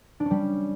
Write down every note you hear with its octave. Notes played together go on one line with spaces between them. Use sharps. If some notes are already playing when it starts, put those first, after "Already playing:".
D4
C#4
G3